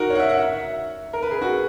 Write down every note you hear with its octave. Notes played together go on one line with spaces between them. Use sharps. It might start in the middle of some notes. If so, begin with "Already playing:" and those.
Already playing: D#4 F#4 A#4
C#5
F#5
E5
F#5
E5
A#4
B4
G#4
F#4